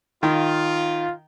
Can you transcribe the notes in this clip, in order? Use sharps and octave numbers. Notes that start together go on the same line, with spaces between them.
D#3 F4